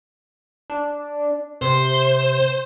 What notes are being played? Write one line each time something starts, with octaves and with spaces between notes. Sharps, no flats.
D4
C3 C5